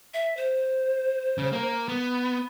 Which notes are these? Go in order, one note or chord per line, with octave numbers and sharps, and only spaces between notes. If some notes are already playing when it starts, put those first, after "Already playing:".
E5
C5
C#3
A#3 A#4
B3